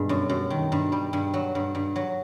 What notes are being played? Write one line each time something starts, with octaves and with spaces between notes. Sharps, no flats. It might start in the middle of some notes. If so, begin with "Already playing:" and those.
Already playing: G2 B2 G#3
F#2
F#2
D#3
G2
G3
G2
F#3
G2
G2
F#3